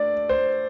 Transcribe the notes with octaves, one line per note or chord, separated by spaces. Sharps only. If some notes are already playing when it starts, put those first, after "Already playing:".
Already playing: A3 D4 D5
C5